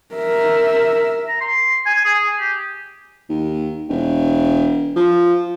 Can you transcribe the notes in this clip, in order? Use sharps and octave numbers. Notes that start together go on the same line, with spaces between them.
A#4 E5
A#5
C6
G#5
G#4
G4
D#2
E1
F3